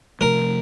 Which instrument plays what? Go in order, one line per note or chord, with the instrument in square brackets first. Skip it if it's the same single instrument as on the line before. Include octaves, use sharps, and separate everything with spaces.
[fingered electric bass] C3 F3 A3 [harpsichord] A#4